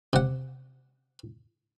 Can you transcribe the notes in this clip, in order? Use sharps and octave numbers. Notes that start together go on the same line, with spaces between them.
C3 F#5